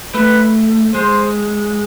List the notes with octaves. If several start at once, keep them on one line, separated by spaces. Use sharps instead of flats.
A3 B4
G#3 C5